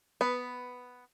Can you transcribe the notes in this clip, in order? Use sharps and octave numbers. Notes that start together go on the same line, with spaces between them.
B3 B4